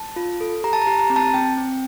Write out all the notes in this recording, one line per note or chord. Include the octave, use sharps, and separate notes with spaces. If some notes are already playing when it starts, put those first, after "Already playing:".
Already playing: A5
F4
A4
G4 A#5
A5
A#5
G4
A#5
C4
A5
C4 G5
C4